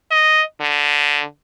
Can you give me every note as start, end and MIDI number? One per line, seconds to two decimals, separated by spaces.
0.11 0.41 75
0.61 1.23 50